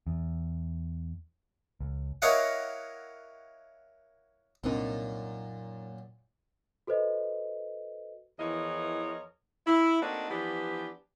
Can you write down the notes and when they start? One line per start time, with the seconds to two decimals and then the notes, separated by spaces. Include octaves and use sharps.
0.07 E2
1.80 C#2
2.22 E4 A#4 C#5 D#5 F5 F#5
4.64 C2 F#2 A#2 A#3 C4 D4 D#4
6.87 F#4 A4 B4 C5 D#5
8.39 E2 E3 F3 A#4 C#5 D#5
9.67 E4
10.02 A3 A#3 C4 D4 D#4 F#4
10.29 E3 F3 B3 D4 G4 B4